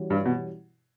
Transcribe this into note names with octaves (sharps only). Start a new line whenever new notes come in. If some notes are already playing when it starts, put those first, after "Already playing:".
Already playing: E3 G3 C#4 F#4
G2
B2